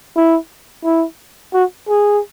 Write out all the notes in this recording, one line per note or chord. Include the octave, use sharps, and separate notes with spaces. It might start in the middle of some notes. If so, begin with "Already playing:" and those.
E4
E4
F#4
G#4